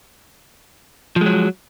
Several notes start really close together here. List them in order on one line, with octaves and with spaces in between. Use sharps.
F3 G#3 F#3